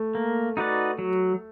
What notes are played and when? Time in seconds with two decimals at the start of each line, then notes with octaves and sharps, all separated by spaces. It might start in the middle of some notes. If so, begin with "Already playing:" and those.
Already playing: A3
0.15 A#3
0.57 D#4 F#4 B4 D5
0.99 F#3